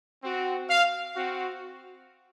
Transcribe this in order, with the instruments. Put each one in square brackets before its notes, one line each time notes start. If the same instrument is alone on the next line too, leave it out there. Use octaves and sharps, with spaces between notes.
[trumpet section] C4 F#4
F5
C4 F#4